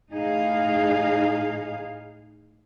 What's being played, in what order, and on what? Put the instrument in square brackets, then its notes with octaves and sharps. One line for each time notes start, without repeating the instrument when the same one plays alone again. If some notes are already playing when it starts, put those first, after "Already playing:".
[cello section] A2 D#4 G#4 F5